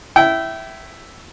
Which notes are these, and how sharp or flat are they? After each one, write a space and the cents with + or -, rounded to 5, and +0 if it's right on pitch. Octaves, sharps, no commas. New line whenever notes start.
E4 +0 G5 -25